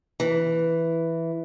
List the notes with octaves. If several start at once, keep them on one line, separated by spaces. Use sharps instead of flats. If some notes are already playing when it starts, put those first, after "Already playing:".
E3